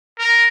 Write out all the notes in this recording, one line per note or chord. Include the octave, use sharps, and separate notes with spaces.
A#4